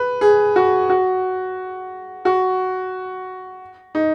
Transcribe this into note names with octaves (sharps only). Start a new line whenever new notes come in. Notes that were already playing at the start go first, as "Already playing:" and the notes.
Already playing: B4
G#4
F#4
F#4
F#4
D#4